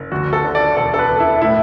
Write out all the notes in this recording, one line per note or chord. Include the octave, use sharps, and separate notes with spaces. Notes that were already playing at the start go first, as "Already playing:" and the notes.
Already playing: F#1
D2 F#4
A4
D3
D5
E1 A4
A4
B4
E1
E4
A2 E4